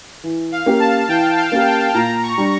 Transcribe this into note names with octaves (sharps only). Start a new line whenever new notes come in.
E3
F5
A#3 C#4 G4 A#4
A5
E3 G5
F5
A#3 C#4 G4 A#4
G5
A#2 A#5
C#6
G3 D4